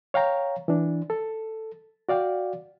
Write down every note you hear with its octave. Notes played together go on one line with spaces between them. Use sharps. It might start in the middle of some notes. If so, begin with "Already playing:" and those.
C#5 F5 G5 A#5
E3 D4
A4
F#4 D5 F5 G5